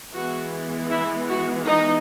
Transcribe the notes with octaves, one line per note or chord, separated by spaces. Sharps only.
E3 G#3 B3 F#4
E4
F#4
D#4